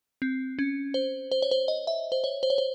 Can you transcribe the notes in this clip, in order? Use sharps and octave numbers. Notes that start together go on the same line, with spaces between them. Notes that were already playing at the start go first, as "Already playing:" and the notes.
C4
C#4
C5
C5
C#5
C5
D#5
E5
C5
C#5
C5
C#5
C5